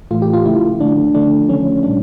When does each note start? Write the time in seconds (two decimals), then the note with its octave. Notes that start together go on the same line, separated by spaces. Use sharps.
0.11 A2 E3 A3 F4
0.22 G4
0.34 F4
0.46 C#3 F3 A3 E4
0.79 D3 A3 D4
1.14 D3 F3 A3 D4
1.49 C#3 F3 A3 C#4
1.83 A#2 G3 D4